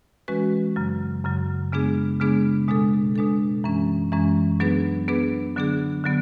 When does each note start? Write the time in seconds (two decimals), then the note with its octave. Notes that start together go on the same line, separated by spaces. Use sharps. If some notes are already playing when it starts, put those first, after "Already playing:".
0.28 E3 G#3 C#4 F#4 B4
0.76 F#2 C#3 F#3
1.24 F#2 C#3 F#3
1.72 C#3 G#3 B3 D4 G#4
2.20 C#3 G#3 B3 D4 G#4
2.68 B2 G#3 D4 A4
3.16 B2 G#3 D4 A4
3.64 F#2 E3 G#3 C#4
4.12 F#2 E3 G#3 C#4
4.60 F#3 B3 D4 G#4 B4
5.08 F#3 B3 D4 G#4 B4
5.56 D3 F#3 B3 D4 G#4
6.04 D3 F#3 B3